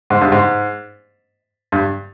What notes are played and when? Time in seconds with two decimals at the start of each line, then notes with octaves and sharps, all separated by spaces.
0.10 G#2
0.21 G2
0.32 G#2
1.72 G2